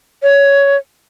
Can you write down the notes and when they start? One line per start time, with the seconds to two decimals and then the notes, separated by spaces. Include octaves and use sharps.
0.23 C#5